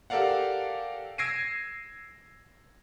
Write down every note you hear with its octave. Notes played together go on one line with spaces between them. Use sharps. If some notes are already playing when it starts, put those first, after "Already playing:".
G4 A4 A#4 D5 F5 F#5
E6 G#6 A#6 C7 D7 D#7